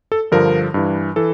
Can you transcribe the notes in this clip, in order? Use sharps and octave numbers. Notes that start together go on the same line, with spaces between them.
A4
G2 D3 F3 A#4
G2 E3
E3 A4